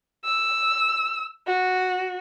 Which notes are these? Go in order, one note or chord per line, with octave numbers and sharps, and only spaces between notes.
E6
F#4